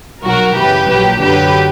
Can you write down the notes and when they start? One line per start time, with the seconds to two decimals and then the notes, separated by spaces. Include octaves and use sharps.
0.23 B1 B2 F#3 F#4 A#4
0.57 F#2 C#3 E3 G4 B4
0.90 A#1 A#2 F#3 G4 B4
1.22 F#2 D3 F#3 G4 B4